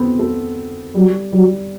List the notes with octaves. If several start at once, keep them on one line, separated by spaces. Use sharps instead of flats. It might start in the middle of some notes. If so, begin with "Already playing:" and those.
Already playing: A3 B3 C4
A3
F#3 G3
F#3 G3